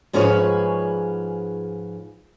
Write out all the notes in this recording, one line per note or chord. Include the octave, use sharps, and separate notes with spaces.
G#2 F3 C#4 G#4 B4 C#5